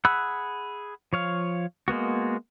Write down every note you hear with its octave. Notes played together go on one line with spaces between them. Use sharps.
G#4 F#5 B5 E6 F#6
F3 C#5 F5
G#3 A#3 B3 F#4